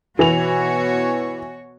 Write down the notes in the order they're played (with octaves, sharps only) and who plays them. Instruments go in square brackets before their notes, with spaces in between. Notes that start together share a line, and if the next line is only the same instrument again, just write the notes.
[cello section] B2 F#4 C#5 [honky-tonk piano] E3 F7